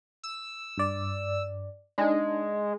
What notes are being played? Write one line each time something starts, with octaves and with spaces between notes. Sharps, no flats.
E6
G2 D5
G#3 D4 D#4